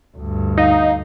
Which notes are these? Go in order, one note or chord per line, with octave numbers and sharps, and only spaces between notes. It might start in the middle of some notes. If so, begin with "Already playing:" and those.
D2 G2
D#4 F5